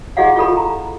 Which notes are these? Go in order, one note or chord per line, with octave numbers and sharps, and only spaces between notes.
E4 G4 G#4 D#5 F5 F#5
F4 G4 A4 B5
A#5